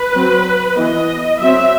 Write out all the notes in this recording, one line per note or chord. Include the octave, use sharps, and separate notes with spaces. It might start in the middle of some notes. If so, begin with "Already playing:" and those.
Already playing: B4
F#3 C4
E3 B3 D#5
F#3 C4 E5